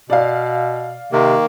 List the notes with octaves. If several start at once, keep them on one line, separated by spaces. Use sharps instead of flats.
B2 D5 F5
C3 D#3 A#3